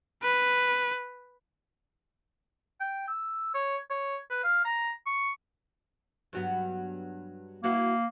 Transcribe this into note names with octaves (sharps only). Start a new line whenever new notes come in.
B4
G5
E6
C#5
C#5
B4
F5
A#5
C#6
G2 F#3 B3
A#3 E4 F#4 B4